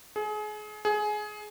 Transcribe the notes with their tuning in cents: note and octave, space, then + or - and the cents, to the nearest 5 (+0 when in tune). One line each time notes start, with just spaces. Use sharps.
G#4 +30
G#4 +20